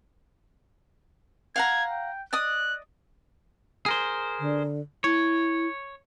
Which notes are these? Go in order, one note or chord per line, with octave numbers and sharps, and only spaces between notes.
F5 F#5 A#5 G#6
G5
D5 D#5 D#6 F#6
G#4 A#4 C5
D3
E4 C#5